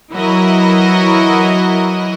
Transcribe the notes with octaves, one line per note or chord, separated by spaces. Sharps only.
E3 F#3 E4 F#4 A#4 D#5